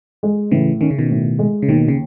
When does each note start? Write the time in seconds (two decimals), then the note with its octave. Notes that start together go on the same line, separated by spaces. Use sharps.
0.23 G#3
0.51 A2 C#3 E3
0.81 D#3 C#4
0.90 C#3
0.99 B2 D#3
1.11 A2
1.39 G#3
1.62 C#3
1.68 D#2 B2 D#3
1.88 C#3